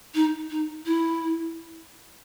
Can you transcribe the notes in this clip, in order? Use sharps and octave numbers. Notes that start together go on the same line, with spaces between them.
D#4
D#4
E4